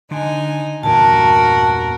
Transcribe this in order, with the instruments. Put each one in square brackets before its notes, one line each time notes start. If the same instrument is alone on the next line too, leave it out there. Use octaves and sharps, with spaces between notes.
[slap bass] D3 [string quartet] D#4 G#5
[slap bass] E2 G2 A#2 [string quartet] F#4 A#4 [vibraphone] A5